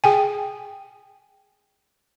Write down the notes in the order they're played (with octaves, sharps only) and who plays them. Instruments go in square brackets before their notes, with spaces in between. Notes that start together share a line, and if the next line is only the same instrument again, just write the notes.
[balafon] G#4 G5 G#5